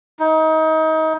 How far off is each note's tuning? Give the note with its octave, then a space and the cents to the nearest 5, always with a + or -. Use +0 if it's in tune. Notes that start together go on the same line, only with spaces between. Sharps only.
D#4 +30